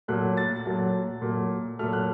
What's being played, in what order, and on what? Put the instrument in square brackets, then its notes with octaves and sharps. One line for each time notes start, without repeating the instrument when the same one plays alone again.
[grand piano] A#2 F#3 A3 F#6
A6
A#2 F#3 A3
A#2 F#3 A3
A#2 F#3 A3 F6
F#6